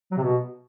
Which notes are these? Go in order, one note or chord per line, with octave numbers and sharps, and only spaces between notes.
F#3
C3
B2